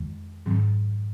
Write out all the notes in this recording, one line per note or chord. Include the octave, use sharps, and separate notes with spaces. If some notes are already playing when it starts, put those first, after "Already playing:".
Already playing: F2 D#3 G#3
G#2 D#3 F#3 C4